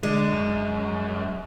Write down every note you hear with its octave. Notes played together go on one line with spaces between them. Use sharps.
D3 G#3
F#2